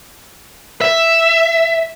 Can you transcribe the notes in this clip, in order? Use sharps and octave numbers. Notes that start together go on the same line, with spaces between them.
E5